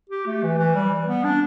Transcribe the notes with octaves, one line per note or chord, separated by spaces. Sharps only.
G4
A3
E3
E3
G3
B3
D4